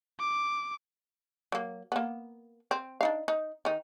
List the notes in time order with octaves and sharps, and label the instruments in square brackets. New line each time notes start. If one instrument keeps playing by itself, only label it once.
[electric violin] D6
[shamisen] F#3 A#3
A#3 B3
C4
D4 D#4 F5
D#4
D#3 D#4